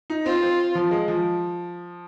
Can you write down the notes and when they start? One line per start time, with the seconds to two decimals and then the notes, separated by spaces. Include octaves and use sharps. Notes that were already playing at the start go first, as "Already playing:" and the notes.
0.10 D#4
0.26 C4 F4
0.42 C4
0.75 F3
0.91 G#3
1.08 F3